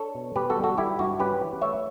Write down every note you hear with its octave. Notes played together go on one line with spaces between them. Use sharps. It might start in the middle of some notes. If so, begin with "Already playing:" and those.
Already playing: D4 A4 C#5
B2
B2 G4 B4
F#4 A4
G3
F#4 A4
G3 E4 G4
G2 F#4
C#4 G4 B4
E3
A3 C#5 E5